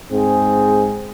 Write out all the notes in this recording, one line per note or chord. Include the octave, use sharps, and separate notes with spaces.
G#2 C4 G#4